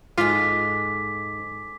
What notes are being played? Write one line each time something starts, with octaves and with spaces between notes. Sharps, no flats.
G#2 G#3 F4 A4 F5 D6 B6